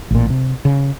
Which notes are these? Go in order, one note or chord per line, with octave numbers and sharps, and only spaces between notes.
A1 A#2
C3
C#3